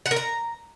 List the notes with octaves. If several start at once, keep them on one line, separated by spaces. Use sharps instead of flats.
F#5
A#4
A#5